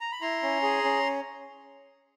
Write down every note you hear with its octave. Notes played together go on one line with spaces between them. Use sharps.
A#5
B5
E4 A#5 C6
C#4
G#4
C#4